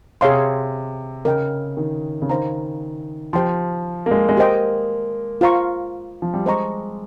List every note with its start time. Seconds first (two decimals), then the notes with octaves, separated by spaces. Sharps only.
0.21 C3 G#4 C#5 F5 C6
1.25 C#3 A#4 D#5 G5
1.77 D#3
2.22 C#3
2.30 D#3 C5 F5 A#5
3.33 F3 G4 C5 G5 C6
4.06 A#3
4.11 G#3
4.29 G#3
4.37 A#3 G4 C5 D#5 G5
5.41 F4 C5 F5 A#5 C#6
6.22 F3
6.34 G3
6.46 G#3 C5 D#5 A#5 C#6